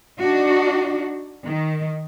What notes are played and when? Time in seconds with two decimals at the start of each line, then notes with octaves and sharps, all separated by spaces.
0.19 D4 D#4 F#4
1.46 D#3